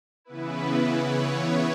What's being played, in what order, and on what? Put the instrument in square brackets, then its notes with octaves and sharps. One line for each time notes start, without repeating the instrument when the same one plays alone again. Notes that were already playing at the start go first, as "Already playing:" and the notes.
[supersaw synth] C#3 E3 B3 E4 B4
C#5